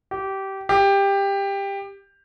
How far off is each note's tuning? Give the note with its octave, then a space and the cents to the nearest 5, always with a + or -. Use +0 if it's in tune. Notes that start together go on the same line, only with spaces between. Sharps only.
G4 -20
G4 +15